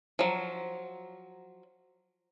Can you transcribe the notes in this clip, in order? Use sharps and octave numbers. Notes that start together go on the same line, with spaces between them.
F3 F#3